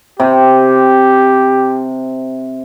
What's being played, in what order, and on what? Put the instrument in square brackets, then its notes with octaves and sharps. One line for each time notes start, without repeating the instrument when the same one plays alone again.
[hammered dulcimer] C3 [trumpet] G4